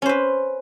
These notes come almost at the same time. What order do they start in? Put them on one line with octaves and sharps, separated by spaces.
C#4 C5 B4